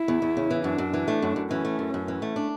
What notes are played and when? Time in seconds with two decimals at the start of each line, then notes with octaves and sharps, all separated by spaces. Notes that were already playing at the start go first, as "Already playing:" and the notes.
Already playing: E4
0.08 E2
0.22 E2
0.37 C#3
0.51 E3
0.64 F#2 D4
0.78 F#2
0.94 E3
1.08 A3
1.22 F#2
1.36 F#2
1.51 E3 C#4
1.65 A3
1.79 F#2
1.94 F#2
2.08 E3
2.22 A3
2.36 D4